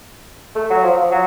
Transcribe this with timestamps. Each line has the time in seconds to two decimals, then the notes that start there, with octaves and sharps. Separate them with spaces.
0.55 A3
0.70 F#3
0.83 F3
0.97 F3
1.11 F#3